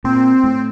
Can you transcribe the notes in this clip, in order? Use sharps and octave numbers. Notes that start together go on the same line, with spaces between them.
A#2 C4
A2